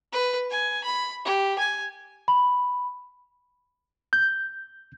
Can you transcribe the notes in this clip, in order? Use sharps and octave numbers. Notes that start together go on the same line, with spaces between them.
B4
G#5
B5
G4
G#5
B5
G6